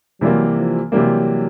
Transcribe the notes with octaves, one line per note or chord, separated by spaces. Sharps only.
C3 E3 F#3 G3 A#3
F3
C3 E3 F#3 G3 A#3